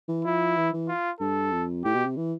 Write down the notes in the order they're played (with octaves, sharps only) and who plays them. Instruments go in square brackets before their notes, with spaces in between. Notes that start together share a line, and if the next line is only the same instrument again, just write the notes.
[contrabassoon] E3
[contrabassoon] F3 [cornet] E4
[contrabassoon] E3
E3
[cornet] F4
[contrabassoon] G2 [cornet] A4
[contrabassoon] F2
[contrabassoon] A2 [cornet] G4
[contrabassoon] B2
C3
E3